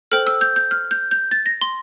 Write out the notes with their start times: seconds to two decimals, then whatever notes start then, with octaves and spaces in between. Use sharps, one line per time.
0.12 A4 C5 G5 F6
0.27 E6
0.41 G6
0.56 G6
0.71 F6
0.91 G6
1.11 G6
1.31 A6
1.46 A#6
1.61 C6